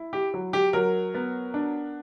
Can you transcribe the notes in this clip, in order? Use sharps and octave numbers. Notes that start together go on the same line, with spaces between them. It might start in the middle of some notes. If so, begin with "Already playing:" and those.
Already playing: E4
G4
F#3
G4
F#3 A#4
B3
D4